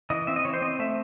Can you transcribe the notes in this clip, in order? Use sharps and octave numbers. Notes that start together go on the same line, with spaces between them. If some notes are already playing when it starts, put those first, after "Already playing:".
E3 D#5
C4 E5
D#5
E3 C#5
C5
C4 D#5
A3 E5